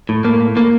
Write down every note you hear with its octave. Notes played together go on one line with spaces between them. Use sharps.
A2
A2 A#3
A2
A2 A#3